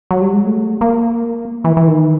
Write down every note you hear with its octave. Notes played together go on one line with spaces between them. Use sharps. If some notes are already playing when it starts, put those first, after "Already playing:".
F#3
G3
G#3
A3
A#3
E3
E3
D#3